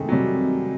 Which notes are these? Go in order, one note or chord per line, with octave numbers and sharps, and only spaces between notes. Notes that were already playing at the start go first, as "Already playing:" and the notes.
Already playing: C3 D#3 G#3 A3
F#3
C3 G3